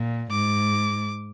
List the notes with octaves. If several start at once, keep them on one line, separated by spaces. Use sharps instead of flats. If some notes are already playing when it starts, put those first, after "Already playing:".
Already playing: A#2
G#2 D6